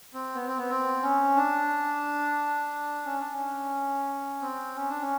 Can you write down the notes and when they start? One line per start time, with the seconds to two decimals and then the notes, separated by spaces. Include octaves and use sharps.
0.14 C4
0.35 B3
0.47 C4
0.58 B3
0.69 C4
1.03 C#4
1.36 D4
3.06 C#4
3.19 D4
3.33 C#4
4.41 C4
4.76 C#4
4.89 D4
5.01 C#4